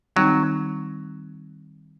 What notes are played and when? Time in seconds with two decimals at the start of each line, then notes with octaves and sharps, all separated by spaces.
0.16 D#3 F#3 G3 C4 D#4